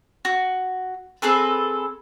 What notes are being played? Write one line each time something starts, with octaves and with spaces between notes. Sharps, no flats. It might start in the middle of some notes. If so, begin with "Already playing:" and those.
F#4
C4 G#4 A4 B4